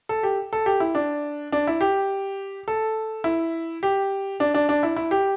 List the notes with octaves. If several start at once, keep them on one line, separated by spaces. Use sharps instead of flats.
A4
G4
A4
G4
E4
D4
D4
E4
G4
A4
E4
G4
D4
D4
D4
E4
E4
G4